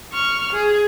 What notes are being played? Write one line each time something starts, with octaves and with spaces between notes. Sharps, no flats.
C#6 F6
G#4